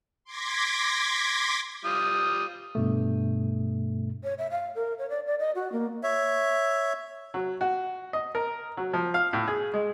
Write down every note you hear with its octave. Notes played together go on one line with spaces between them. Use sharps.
C6 D6 G#6 A#6 B6
G3 F4 D#6
G2 B2 A3
C#5
E5
F5
A#4
C#5
D5
D5
D#5
F#4
A#3
C#5 E5
F#3
F#4
D#5
A#4
F#3
F3
F5
A2
G#4
G#3